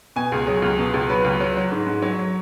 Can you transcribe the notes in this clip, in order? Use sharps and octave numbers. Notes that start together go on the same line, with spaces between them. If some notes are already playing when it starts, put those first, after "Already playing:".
B2 G#5
C#2 G#4
F#3 G#4
C#2
B2
C#2
F#3 B4
C#2
F#3
F#3
G#2
G#2
F#3 C#5
F#3